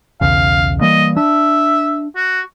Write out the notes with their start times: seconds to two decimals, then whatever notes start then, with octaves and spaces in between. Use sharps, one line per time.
0.21 B1 E2 C#3 F5
0.81 E3 G3 A#3 D#5
1.17 D4 E5
2.16 F#4